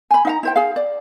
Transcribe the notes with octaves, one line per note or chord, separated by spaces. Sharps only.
G#5 B5
D#4 F5 A#5
E4 C5 G5
G#4 F5
D5